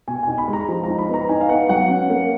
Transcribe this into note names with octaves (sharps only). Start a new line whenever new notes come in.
B2 G#5
D#4 G#5
B5
G#3
A#5
F3
D#4 A#5
B5
B3 A#5
D#4 G#5
F5
B3 F#5
F#3 F#5
C#4
A#3